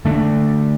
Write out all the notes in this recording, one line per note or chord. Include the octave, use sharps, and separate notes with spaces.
D3 A3 D4